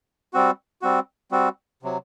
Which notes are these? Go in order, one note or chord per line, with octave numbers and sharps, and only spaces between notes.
G3 C4 F#4
G3 C4 F#4
G3 C4 F#4
C3 F#3